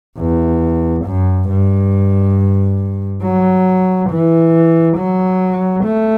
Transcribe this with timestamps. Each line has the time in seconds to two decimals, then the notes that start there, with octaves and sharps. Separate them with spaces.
0.18 E2
1.05 F#2
1.49 G2
3.23 F#3
4.10 E3
4.97 F#3
5.84 A3